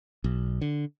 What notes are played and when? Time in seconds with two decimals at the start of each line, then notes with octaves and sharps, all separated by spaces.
0.24 B1
0.61 D3